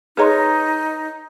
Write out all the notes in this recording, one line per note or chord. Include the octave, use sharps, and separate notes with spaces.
D#4 G#4 B4 C#5 D#5 A#5 C6